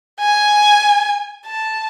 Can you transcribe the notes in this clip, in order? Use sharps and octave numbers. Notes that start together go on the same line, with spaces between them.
G#5
A5